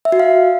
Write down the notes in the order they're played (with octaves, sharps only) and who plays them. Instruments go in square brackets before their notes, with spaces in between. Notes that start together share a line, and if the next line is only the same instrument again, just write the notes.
[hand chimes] E5
F#4
F5